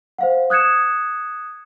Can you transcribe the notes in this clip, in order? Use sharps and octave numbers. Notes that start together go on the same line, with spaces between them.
C5 F5 F#5
D#6 F#6 G#6 C#7 E7